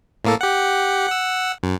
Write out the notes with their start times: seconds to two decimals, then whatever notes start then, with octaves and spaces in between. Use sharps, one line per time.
0.25 A2 A#3 A4
0.41 G4 F#5
1.08 F#5 E6
1.63 F#2